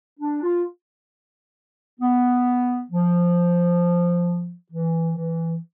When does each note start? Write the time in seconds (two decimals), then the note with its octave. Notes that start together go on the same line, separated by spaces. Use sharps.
0.20 D4
0.42 F4
2.00 B3
2.91 F3
4.71 E3
5.16 E3